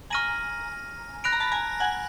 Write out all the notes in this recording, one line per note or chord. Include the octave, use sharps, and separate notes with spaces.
G#5 A#5 C#6 F6 A#6 D#7 F#7
B5 F#6 A#6 D7 F7
A#5
A5 B5
G#5 A#5
F#5 G#5